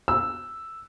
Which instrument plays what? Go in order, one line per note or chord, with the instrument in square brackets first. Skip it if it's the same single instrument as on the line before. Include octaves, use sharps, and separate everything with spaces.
[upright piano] E6